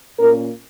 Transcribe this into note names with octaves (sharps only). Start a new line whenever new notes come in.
A#2 A#3 C#4 A#4